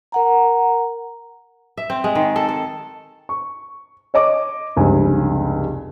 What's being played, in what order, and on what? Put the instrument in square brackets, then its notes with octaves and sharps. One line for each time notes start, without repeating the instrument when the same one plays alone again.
[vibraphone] A#4 F#5 A#5
[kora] E5
C4
G#3
D#3
A4
A4
[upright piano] C#6
C#5 D#5 D6
F1 C#2 G2 G#5